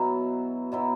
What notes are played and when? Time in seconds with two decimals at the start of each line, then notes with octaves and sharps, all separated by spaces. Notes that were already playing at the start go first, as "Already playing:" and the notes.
Already playing: B2 F#3 E4
0.72 B2 F#3 E4